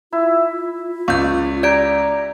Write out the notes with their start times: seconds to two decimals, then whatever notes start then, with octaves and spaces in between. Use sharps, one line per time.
0.13 E4 F4
1.08 C#2 D5 C#6 G6
1.63 G4 D5 A#5 G#6 D7